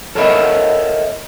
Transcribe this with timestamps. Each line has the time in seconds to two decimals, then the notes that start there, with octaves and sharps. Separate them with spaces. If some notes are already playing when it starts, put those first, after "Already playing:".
0.15 A4 A#4 C#5 D#5 E5 B5